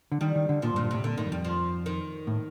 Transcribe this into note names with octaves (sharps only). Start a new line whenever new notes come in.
D3
D#3 G3
D#3
D3
A#2 F3
G2
A#2
G2
A2 C3
A#2 D3
A2 D#3
G2
F2 G3
F3
D#3
A2